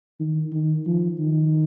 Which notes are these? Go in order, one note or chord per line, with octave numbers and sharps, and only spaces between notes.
D#3
D#3
F3
D#3